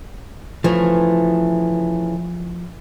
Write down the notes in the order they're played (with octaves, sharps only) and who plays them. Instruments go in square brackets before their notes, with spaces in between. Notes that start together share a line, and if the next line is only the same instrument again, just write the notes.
[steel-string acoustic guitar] C#3 E3 A3 [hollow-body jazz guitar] F3